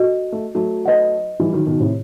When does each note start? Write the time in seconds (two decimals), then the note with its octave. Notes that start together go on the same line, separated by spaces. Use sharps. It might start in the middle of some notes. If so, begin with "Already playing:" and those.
Already playing: F#4 A4 D#5
0.32 A3
0.55 F#3 A3
0.86 B4 D#5 F#5
1.40 E3 G3
1.53 D#3 F#3
1.66 B2 D#3
1.80 A2 C3